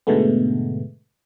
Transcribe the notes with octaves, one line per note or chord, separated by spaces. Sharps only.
G#2 B2 D3 G#3 A3 B3